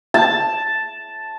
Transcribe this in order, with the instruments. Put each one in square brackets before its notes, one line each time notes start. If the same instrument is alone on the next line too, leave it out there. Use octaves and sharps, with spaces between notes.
[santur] A5